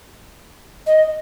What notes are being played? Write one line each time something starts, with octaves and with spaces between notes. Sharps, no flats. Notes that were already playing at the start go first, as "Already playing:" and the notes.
D#5